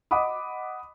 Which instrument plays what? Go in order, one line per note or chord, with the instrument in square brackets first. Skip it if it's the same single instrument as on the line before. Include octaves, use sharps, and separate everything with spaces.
[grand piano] D#5 F#5 B5 D6 D#6